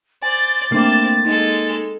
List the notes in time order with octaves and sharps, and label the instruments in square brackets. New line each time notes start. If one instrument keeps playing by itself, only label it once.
[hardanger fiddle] C5 D5 [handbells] G#5 [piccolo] A6
[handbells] A3 D4 D6 [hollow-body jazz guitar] A#3 [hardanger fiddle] C4 A5
[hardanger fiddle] G#3 A4 [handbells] D#4